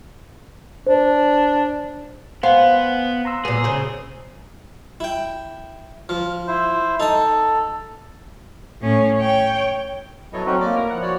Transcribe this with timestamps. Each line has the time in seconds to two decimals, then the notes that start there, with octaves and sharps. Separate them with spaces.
0.87 D4 C5
2.43 B3 C5 F5 F#5 G#5
3.25 A#5 C6 E6
3.45 A#2 B3 G#4
3.64 C#3 C4
5.00 E4 G5
6.09 F3 F6
6.48 E4 C5
7.00 D#4 A4 D#6
8.82 A2 C#4
9.18 C#5 G5
10.33 B2 F#3 E4 A4 C#5 D#5
10.46 A3 C4 C#4 D#4 F#4
10.61 A#3 D5 D#5 D6
10.76 E4 A#4
10.90 F3 F#5
11.02 F#4 C#5 D5